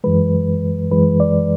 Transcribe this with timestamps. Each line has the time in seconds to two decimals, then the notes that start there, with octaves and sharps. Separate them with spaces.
0.04 F#2 E3 G#3 B4
0.91 F#2 E3 G#3 B4
1.20 D5